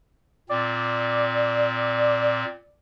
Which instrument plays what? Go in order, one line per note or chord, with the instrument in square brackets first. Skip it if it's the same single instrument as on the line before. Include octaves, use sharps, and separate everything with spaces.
[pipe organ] A#2 C4 [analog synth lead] D5